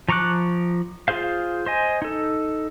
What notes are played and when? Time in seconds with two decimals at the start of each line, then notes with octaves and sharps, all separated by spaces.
0.09 F3 A#5 C#6 D6 F#6
1.08 F4 G#4 C5 F5
1.66 C5 D#5 G#5
2.02 D#4 A4